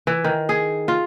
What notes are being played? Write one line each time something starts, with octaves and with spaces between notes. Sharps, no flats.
E3
D#3
G#4
F4